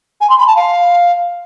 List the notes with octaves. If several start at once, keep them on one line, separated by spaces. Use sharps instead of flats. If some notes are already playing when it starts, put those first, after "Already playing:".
G#5
C6
B5
A5
F5